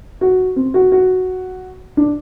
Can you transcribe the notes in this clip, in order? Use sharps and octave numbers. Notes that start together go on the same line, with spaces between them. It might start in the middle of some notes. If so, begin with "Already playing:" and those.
F#4
C4
F#4
F#4
D4